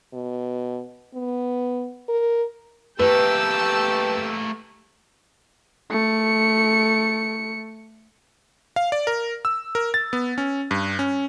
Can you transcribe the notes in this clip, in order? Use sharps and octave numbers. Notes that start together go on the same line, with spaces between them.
B2
B3
A#4
A3 A#3 G4 B4 G5 A5 E6
A3 C#7
F5
D5
A#4
E6
A#4
A6
B3
C#4
G2
C#4